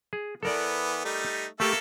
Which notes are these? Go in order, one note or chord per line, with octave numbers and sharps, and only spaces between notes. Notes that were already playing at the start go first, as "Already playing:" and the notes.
G#4
E3 B3 A4 A#4 D5
G3 A3 D#4
A3 A#3 G4 A4 E5